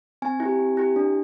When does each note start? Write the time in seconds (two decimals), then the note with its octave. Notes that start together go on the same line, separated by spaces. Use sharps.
0.22 C4 G#5
0.40 E4
0.45 G4
0.59 C4
0.77 E4 G4
0.96 D4